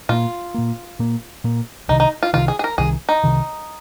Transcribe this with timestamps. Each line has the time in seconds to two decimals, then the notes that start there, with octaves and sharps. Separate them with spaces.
0.09 A#2 A#3 F4
0.54 A#2 A#3
0.99 A#2 A#3
1.44 A#2 A#3
1.88 C2 C3 D#3 D#4
2.00 D#4
2.23 F4
2.33 C2 C3 D#3 F4
2.48 G#4
2.59 G#4
2.64 A#4
2.78 C2 C3 D#3 G#4
3.09 D#4
3.24 C2 C3 D#3